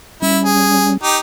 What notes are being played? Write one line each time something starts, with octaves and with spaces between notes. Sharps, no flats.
G3 C#4 E4
G#4
D#4 G4